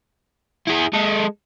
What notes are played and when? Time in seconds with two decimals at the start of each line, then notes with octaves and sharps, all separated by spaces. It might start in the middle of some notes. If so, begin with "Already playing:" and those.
0.68 E4 G#4
0.94 G#3 A4